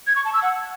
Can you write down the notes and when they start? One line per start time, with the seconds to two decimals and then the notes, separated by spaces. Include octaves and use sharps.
0.07 G#6
0.16 C#6
0.25 A5
0.34 E6
0.42 F#5